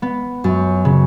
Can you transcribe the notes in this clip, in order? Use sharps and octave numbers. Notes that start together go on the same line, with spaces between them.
B3
F#2
C#3